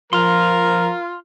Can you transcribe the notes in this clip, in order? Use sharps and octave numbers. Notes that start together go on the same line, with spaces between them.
F3 F4 A#4 F5 C6